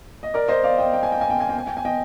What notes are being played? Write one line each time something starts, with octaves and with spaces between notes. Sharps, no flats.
D#5
A#4 D5
C5 D#5
D5 F5
D#5 G5
G5
G#5
G5
G#5
G5
G#5
G5
G#5
G5
G#5
D#5 G5